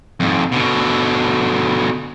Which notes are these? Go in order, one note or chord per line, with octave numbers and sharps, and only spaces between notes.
F2 G#2
B2 D3